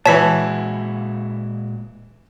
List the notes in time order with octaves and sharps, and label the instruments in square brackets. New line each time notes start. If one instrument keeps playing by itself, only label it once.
[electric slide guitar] A#2 G#3 F#4 [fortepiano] E3 C#5 [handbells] A5 B6